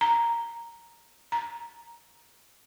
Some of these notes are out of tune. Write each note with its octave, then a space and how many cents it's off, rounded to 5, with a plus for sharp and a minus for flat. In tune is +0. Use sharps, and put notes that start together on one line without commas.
A#5 +0
A#5 +10